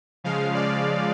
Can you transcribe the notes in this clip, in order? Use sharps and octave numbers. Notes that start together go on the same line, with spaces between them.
C#3 F3 G#3 F5
D5